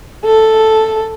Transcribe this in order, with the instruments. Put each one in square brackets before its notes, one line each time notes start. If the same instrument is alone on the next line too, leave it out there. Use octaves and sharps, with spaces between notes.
[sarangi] A4